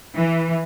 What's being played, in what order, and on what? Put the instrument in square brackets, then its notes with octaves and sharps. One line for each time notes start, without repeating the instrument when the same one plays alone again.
[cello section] E3